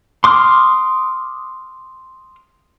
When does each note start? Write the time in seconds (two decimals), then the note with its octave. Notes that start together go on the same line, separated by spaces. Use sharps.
0.24 C6 D6 D#6 F6